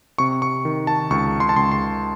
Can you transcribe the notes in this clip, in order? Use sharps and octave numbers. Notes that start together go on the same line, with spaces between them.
C3 C#6
C#6
D#3
A5
C#2 C#6
C6
A5
C#2 C6
C6